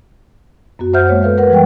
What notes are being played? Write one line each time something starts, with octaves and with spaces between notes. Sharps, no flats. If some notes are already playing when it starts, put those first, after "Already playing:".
F#2 B3 F#4
F#2 C5 E5 F#5 F6 G6
G#3 A#3 C#5
A4 B4 F5
A#4 B4 F#5
E3 G3 G#3 F#5 G5